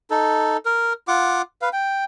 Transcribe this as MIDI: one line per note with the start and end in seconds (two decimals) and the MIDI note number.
0.10 0.57 63
0.10 0.57 69
0.66 0.93 70
1.08 1.42 65
1.08 1.42 78
1.08 1.42 86
1.62 1.69 71
1.62 1.69 77
1.73 2.04 79